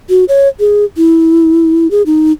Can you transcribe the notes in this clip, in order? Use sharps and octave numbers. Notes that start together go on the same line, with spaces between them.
F#4
C#5
G#4
E4
G#4
D#4